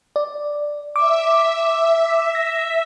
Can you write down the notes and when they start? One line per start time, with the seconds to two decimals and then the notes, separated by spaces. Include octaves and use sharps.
0.16 D5
0.96 E5 D6
2.35 A#6